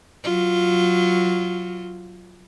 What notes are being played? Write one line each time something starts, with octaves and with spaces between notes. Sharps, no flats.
F#3 F4